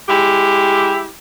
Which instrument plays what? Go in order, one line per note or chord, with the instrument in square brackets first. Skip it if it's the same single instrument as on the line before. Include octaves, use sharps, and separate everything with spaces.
[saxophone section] G#3 E4 G4